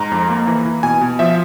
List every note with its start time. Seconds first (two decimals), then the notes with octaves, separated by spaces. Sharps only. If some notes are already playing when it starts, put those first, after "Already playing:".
Already playing: G#2 A#5
0.12 F2
0.29 A#3
0.47 E3
0.65 E3
0.83 B2 G#5
1.01 B2
1.19 F3 E5